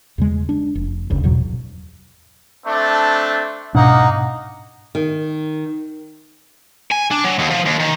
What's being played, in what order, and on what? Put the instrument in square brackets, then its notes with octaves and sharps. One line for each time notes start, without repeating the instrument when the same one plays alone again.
[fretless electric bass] E2 C#3 G#3
D4
F1
F#1 D2 C#3
E2 G#2 B2 F#3
[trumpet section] A3 C4 D4
[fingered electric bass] G#2 B2 D4 [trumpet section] A#3 D#4 F#5
[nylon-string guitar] D#3
[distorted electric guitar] G#5
D4
F#3
D#2
F3
D#2
D#3